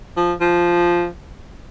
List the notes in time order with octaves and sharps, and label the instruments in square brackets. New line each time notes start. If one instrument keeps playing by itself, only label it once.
[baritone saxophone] F3
F3